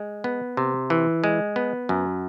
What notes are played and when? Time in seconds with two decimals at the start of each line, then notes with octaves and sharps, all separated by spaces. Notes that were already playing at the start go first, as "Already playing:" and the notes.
Already playing: G#3
0.24 B3
0.57 C3
0.90 E3
1.24 G#3
1.56 B3
1.89 F#2